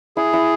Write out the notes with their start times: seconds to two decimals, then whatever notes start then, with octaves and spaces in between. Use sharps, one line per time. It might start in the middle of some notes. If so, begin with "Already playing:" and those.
0.17 E4 G#4
0.33 E4